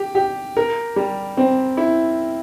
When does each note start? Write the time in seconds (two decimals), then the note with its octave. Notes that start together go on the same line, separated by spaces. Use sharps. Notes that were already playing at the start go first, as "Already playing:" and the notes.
Already playing: G4
0.15 G4
0.57 A#4
0.96 G3
1.37 C4
1.77 E4